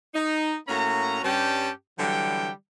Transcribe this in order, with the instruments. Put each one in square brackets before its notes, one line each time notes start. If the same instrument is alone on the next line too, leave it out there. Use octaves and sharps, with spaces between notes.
[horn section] D#4
A2 A#3 C#4 F#4 A#5
G2 G3 C#4 G4 G5 A5
D3 E3 F#3 G3 G5